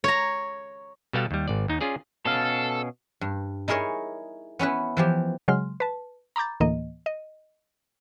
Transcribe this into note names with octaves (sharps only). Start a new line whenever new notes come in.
C#5 A#5
B2 G3 B3 A4 F5 A5
D#2 G3
G#1 D5
D#2 D#4
C#4 F4 G#4 D5
B2 C#4 A4 F5
G2
D#4 E4 G#4 A#4 C#5 D#5
B3 C#4 E4 B4
E3 F3 G4
C#3 F#3 G#3 C6 F6
B4 A5
A#5 B5 D6 G6 A6
D2 A2 E3 A#3 D#5
D#5